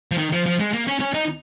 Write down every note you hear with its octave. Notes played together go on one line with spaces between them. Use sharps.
F3
D#3
F3
F3
G#3
A#3
C#4
C#4
D#4